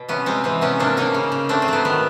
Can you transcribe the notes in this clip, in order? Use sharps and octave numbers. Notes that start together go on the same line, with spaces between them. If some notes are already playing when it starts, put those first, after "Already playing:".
Already playing: B2
C3 B3 C#4
G#3 C4
E3 C4
C3 B3 C#4
A#3 C4 D4
A#3 C#4 D#4
C#3
C#3
A3 C4 D4
C4
F#3 B3
D#3 B3